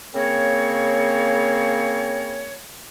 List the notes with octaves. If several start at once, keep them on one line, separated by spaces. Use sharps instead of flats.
C#3 A#3 C4 A#4 C#5